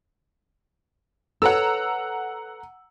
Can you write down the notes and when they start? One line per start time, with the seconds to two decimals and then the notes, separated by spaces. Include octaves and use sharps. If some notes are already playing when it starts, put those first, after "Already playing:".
1.42 A4 B4 C#5 F#5 A#5 E6